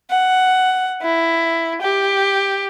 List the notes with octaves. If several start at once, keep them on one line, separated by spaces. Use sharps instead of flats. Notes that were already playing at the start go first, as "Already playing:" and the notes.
F#5
E4
G4